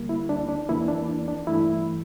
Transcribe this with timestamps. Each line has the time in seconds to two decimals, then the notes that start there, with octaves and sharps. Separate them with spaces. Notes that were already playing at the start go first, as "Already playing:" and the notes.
Already playing: D2 D3 G3 A#3
0.09 E4
0.29 D4
0.49 D4
0.69 E2 E3 A#3 E4
0.88 D4
1.28 D4
1.47 G2 E3 A3 E4